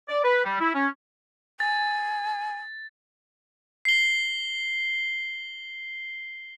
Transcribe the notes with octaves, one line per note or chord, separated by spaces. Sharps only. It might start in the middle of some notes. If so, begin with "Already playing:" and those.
D5
B4
G3
E4
C#4
G#5 A6
C7 G7